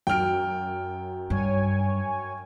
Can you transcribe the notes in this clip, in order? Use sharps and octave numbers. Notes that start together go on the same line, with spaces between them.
F#2 F#3 G5 F6 D7
G2 C#5 G#5